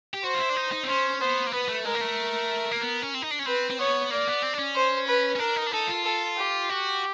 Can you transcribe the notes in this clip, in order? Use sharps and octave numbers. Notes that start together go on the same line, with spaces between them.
G4
F#4 C5
F4
E4
D4
D#4
D#4
C4
C#4 C5
B3 C5
A#3
B3 B4
A3
G#3 A#4
A#3
A3
A#3
B3
C#4
C4
D#4
D4
C#4
C4 B4
C4
B3 C#5
A#3 D5
B3
C4
D4
C#4
C5
B4
C#4
D4 A#4
D#4
D4
D#4 A4
F4
A4
G4
F#4